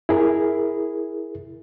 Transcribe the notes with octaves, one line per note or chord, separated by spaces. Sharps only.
E4 G#4 A#4